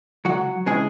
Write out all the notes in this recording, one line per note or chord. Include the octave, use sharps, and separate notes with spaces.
C#2 F#3 F#4
C#3 E3 G#3 G#4